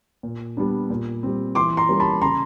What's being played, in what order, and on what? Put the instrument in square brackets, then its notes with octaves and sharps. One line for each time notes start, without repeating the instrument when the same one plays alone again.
[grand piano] A#2
G3 B3 D4
A#2
G3 C4
E3 C6 D6
A#5 C6
G3 A#3 C#4
A5 B5
C#3 A#5 C6